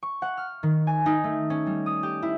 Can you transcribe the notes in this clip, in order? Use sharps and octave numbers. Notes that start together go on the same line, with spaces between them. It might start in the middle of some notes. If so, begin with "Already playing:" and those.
C#6
F#5
F6
D#3
G#5
D#4
A3
C#4
G3
D#6
G4
E4